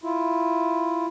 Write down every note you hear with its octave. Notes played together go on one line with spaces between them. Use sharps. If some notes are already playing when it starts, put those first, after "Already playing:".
E4 F4